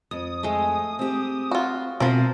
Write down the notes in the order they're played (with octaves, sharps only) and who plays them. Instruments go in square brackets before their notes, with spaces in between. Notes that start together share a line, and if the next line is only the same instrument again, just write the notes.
[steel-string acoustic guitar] F2 [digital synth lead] D#6
[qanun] G#3 A3
[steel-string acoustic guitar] C4 G4
[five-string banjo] F4 F#4
[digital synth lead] B2 [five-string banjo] F3 A#4 [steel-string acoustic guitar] C4 [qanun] B4